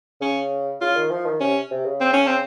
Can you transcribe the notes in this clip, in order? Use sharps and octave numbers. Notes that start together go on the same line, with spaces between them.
C#3 C#4
C#3 F4
D#3
F3
D#3
C3 C#4
C3
C#3
C4
C#4
C4